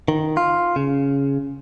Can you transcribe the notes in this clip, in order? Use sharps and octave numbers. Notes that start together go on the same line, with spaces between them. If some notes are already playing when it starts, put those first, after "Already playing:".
D#3
F4
C#3